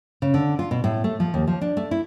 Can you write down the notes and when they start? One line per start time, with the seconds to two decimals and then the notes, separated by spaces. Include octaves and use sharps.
0.22 C#3
0.34 D3
0.59 F4
0.71 B2
0.84 A2
1.04 A3
1.20 F3
1.34 D#2
1.47 F3
1.61 D4
1.77 A3
1.91 E4